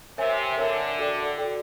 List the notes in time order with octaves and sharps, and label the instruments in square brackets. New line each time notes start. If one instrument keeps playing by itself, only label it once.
[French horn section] C3 [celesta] A#4 C#5 E5 G#5
[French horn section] D3 [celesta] A#4 C#5 E5 G#5
[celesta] F#4 A4 D5 G5
F#4 A4 D5 G5